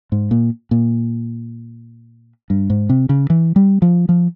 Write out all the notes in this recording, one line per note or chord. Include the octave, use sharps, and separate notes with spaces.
G#2
A#2
A#2
G2
G#2
C3
C#3
E3
G3
F3
F3